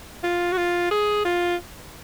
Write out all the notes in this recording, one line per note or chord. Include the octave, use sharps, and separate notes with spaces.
F4
F#4
F4
G#4
F4